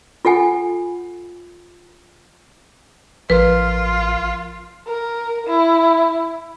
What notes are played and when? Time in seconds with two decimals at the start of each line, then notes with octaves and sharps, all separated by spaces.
0.25 F4 A4 F#5 G#5
3.30 A1 F3 F4 A#4 B4
4.87 A#4
5.47 E4